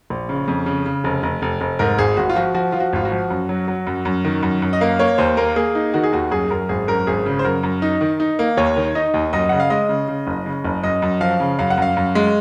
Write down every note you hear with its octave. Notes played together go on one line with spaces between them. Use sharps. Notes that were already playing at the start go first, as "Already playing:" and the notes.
A#1
C#3
F2
C#3
C#3
F1
F1
F1
F1
G#2 A#4
G#1 G#4
G#1 F#4
F4
F3 F#4
F3 F#4
F3 F4
F#4
G#1 F4
F#4
F3
F#2
F#3
F#3
F#2
F#2
D#3
F#2
F#2
D#5
A#3 F5
A#3 C#5
D#2 C5
A#3 A#4
A#3 G#4
D#4
D#3 F#4
G#4
D#2 F#4
F#2 G#4
F#2 A#4
G#1 G#4
F#2 A#4
G#1 G#4
C#3
C5
F#2 A#4
F#2
D#4
D#3
D#4
A#3
D#2 C#5
D#3
D#4 D#5
D#2
F#2 D#5
C#3 F#5
F5
G#3 D#5
C#3
C#3
F#1
C#3
F#1
F#2 D#5
F#2
F3 F5
C#3
F#2 F5
F#5
F#2 F5
F#2
G#3